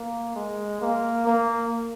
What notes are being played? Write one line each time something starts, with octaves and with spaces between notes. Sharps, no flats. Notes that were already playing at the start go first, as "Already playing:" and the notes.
Already playing: A#3
G#3
A#3
A#3